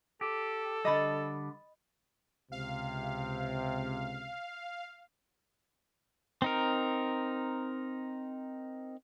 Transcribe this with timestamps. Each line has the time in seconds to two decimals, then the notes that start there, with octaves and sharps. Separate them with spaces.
0.21 G4 A4
0.85 D3 G3 D#5 B5 A6
2.52 C#2 C3 F5
6.42 C4 D#4 A#4